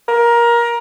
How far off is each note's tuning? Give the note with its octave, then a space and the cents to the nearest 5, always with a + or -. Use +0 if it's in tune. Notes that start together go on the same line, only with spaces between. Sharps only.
A#4 +20